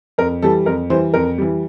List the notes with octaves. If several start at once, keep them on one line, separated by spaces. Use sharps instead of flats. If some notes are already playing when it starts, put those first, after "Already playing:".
F2 A#4
E3 G3 A4
F2 A#4
E3 G3 C5
F2 A#4
E3 G3